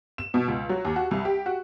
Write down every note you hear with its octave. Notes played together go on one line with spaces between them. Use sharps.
E7
B2
C#2
F#3
D#2
F#4
C2
G4
F#4